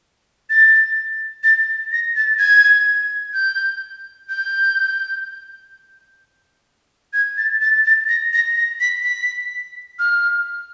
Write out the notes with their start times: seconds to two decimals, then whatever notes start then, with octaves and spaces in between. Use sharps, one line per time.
0.50 A6
1.44 A6
1.92 A#6
2.16 A6
2.39 G#6
3.33 G6
4.29 G6
7.13 G#6
7.37 A6
7.61 A6
7.85 A6
8.09 A#6
8.33 A#6
8.56 A#6
8.80 B6
9.03 B6
9.99 F6